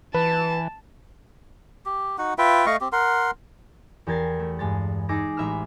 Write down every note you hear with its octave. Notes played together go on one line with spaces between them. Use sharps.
E3 B4 A5
G4
D#4 F#4 F#5
F4 B4 E5 G5
A3 D#5 F5 C#6
C4 G4
A#4 F#5 C6
E2 G4 A#4 G#6 A6 C7
A3
G2 G#3 A6
D#4 G#4 D6 E6 A#6
A1 G#3 E5 B5 E6 F6